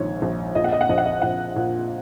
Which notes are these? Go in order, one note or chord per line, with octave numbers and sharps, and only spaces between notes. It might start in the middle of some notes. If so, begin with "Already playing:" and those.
Already playing: A#1 G#2 D#3 C#5
A#1
A#2 D#5
F#5
D#5
F#5
A#1 D#5
F#5
D#5
A#1 F#5
A#2